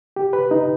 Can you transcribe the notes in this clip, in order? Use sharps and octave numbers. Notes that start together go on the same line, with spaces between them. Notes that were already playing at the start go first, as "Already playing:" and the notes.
G4
B4
D#4